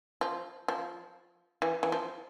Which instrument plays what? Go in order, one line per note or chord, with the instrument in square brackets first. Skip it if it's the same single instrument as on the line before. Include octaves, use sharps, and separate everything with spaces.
[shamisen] F3
F3
E3
E3
F3